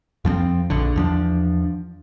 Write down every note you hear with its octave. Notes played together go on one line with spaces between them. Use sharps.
F2 F3 B3 C4
A#1 D3
E2 F3 D4